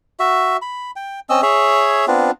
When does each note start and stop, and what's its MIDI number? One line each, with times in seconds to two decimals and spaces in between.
0.20 0.57 66
0.20 0.57 76
0.62 0.91 83
0.96 1.20 79
1.29 1.41 60
1.29 1.41 61
1.29 1.41 75
1.29 1.41 88
1.43 2.05 68
1.43 2.05 73
1.43 2.05 76
2.08 2.31 59
2.08 2.31 60
2.08 2.31 62
2.08 2.31 65